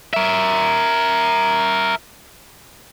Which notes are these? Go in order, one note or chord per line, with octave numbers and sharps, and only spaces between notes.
A#4 E5